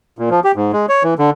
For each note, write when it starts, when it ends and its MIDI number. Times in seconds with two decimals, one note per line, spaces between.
0.19 0.29 46
0.30 0.40 53
0.44 0.52 67
0.56 0.72 44
0.73 0.86 56
0.89 1.03 73
1.03 1.14 52
1.19 1.30 50